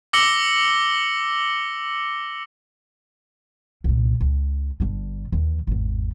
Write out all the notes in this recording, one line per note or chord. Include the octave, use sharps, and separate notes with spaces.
D6 E6 A#6 C#7 F#7 G7
C2 A#2
C#2
G1 D3
D#2 E3
G#1 E2